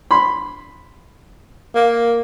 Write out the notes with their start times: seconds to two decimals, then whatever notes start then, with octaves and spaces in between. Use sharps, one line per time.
0.11 B5 C6
1.76 A#3